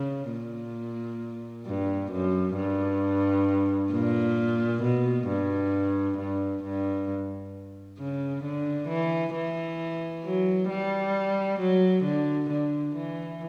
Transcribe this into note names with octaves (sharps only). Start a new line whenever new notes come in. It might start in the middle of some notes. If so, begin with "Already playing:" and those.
Already playing: C#3
A#2
G2
F#2
G2
A#2
B2
G2
G2
G2
C#3
D3
E3
E3
F#3
G3
F#3
D3
D3
E3